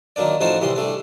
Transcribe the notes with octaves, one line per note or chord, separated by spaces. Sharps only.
D#3 F#3 A#3 D4 D5
A1 F3 D#4 F#4 C5 A5
C2 E3 G3 C6
G3 A3 D4